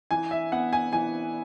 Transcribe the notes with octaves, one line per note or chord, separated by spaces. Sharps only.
E3 G#5
E5
B3 F#5
G#5
E3 G#5